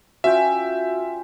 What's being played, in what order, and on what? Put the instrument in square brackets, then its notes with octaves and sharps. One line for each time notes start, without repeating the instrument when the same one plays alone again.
[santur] C#4 F4 G5 [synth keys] F#4 [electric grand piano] E5